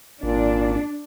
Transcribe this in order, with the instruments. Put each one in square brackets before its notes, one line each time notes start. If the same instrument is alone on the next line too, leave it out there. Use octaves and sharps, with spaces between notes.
[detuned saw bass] G#1 [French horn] A#2 [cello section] D4